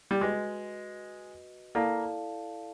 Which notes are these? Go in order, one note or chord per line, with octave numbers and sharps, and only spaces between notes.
G3
G#3 F#4 B4 D#5
A#3 E4 A4 D5 F5 A5